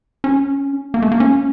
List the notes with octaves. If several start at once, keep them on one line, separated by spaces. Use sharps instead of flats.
C#4
A#3
A3
A#3
C#4